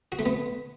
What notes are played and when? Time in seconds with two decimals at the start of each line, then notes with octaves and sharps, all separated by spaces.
0.12 F#4
0.19 A3
0.26 B3